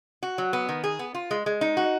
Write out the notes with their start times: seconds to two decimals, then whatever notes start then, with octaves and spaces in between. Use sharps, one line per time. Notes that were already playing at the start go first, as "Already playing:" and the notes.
0.23 F#4
0.38 F#3
0.53 B3
0.69 D#3
0.84 G#4
0.99 B3
1.14 F4
1.31 G#3
1.46 G#3
1.61 D#4
1.77 F#4